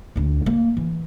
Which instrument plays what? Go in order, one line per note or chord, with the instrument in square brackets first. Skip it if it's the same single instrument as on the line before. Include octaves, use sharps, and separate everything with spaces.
[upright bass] D2 D4
A#3
E3